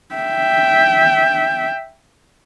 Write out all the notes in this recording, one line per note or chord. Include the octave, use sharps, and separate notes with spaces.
E5 G5